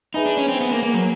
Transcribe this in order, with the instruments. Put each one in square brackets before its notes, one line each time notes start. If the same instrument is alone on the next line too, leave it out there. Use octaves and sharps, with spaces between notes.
[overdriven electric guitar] D#4 [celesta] G#4 B4 E5 G#5 B5
[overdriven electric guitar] D4
C#4
C4
B3
A#3
A#3
F#3